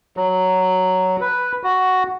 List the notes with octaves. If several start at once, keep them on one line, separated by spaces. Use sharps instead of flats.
F#3
B4
F#4